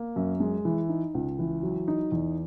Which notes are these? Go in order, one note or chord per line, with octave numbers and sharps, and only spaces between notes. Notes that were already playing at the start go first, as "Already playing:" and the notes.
Already playing: A#3
F#2
G#3
E3
D#4
C#2
E3
F#3
D#4
E2